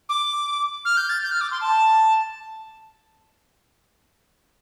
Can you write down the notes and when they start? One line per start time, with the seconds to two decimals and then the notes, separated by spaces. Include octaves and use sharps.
0.09 D6
0.85 F6
0.97 G6
1.09 A6
1.23 G6
1.32 F6
1.41 D6
1.51 C6
1.61 A5